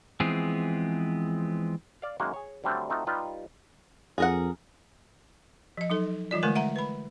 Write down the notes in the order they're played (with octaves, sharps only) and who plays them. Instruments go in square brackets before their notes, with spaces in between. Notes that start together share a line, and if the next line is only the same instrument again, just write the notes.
[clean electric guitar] E3 F3 G#3 B3 C4 G#4
[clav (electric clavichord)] D5 F5
F#2 D#3 G#3 A#3 F#4 F#5
G#4 C#5
D3 F#3 G3 A3 C4 D4
A3 C4 D#4 F4 F#4
G3 D#4 F4 G4 B4
[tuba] F2 [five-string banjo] G#4 A#4 F#5
[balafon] F3 D#5
F#3 D#4 A4
E3 G3 F4 D5
D3 G#3 A3 A#4 G#5
E5 F#5 A#5
B4 B5